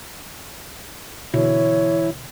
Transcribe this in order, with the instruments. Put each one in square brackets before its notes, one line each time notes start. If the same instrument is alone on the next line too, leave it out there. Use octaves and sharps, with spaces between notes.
[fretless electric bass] B2 D3 [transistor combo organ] E3 E4 [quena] C#5